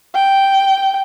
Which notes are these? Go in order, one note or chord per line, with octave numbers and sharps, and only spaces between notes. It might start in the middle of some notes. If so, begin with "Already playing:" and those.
G5